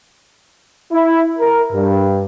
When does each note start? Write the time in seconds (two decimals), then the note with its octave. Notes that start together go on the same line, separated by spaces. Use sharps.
0.92 E4
1.39 A#4
1.72 G2